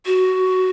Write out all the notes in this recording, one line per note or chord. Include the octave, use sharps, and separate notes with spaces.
F#4